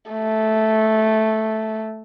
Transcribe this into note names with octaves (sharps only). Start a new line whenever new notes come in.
A3